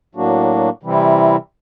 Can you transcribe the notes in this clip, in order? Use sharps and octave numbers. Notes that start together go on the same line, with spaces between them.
A2 F#3 A#3 D4 F#4
C3 E3 G3 C4 E4